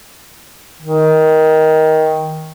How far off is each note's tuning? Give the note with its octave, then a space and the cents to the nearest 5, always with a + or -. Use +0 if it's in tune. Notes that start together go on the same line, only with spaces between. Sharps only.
D#3 +15